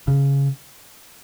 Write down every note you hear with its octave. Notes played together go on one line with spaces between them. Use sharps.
C#3